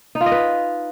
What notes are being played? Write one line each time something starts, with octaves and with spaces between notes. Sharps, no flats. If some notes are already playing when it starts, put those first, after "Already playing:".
D#4
F4
D#5
B4